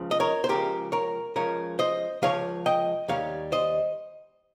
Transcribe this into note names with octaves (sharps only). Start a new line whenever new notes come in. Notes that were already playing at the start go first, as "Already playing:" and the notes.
Already playing: C#2 C#3 F3
D#5
A#4 C#5
C5
C#2 C#3 F3 G4 A#4
A#4 C#5
C#2 C#3 F3 A#4 C#5
C5 D#5
C#2 C#3 F3 C#5 F5
D#5 G5
D#2 D#3 G3 C#5 F5
C5 D#5